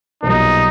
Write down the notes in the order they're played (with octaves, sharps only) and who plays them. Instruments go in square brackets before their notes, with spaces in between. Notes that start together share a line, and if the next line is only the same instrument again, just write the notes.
[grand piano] B1 A#2 G3 A#3 [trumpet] D#4